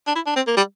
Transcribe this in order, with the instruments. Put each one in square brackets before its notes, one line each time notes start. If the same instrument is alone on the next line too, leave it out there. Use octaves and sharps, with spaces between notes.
[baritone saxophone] D4
E4
D4
C4
A#3
G3